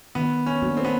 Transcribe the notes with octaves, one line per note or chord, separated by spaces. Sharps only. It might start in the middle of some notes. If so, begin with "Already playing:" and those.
D#3 B3
C#4
F#3 A#3 D4 F#4
C4
B3